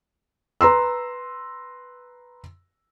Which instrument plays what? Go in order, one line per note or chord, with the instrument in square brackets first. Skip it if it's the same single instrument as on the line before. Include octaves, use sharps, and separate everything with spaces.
[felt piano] B4 A#5 C6 E6